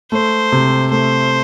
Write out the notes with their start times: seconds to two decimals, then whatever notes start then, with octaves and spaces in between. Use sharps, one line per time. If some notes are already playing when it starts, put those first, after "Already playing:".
0.12 A3 C5
0.52 C3
0.91 A3 C5